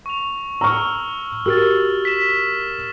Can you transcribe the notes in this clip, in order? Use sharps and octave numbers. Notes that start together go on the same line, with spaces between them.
C#6 F7
A#5 C#6 E6 F6
F#4 G4 A#4 E6 F6 A6
B6 E7